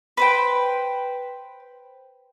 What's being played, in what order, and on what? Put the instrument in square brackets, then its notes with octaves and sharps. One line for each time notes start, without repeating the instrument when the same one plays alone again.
[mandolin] B4 C5 G5